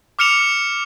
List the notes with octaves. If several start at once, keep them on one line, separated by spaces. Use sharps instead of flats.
D6 F6 C#7 E7 F7